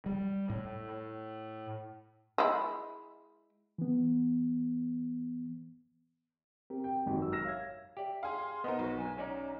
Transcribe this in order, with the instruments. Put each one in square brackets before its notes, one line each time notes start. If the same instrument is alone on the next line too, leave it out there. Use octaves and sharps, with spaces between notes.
[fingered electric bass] G3
A2
[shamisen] G#3 E4
[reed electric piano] E3 B3
C4 G4 A#4
[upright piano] G5
[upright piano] G#1 F#2 [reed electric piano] G#3 C4 G4
[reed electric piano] A#4 E6
[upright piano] E6 A#6 E7 [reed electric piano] F6
[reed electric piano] C#5 E5 G#6 [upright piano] F5
[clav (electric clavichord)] G4 D5 [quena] E5
[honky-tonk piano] G#4 F5 [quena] C6
[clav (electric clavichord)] B3 D#4 [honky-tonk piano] A#4 C5 D#5
[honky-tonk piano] B1 [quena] F#4
[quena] G#5
[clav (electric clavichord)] C#4 D#4 D5 [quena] A#5